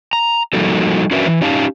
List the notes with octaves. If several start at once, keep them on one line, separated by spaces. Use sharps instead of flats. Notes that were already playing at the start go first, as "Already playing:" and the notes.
A#5
F3 G3 A#3 D#4 F#4 A4
C#4 D4 F#4 A#4 B4 E5
E3
C#4 D#4 G4 F5 A5